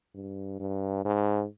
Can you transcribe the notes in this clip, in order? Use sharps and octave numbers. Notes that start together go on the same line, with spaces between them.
G2
G2
G#2